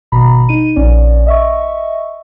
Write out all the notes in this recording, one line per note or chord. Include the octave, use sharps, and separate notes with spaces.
G#1 B2 A#5 B5
D#4 D#7
A#1 C#4 D5
D#5 E5 C#6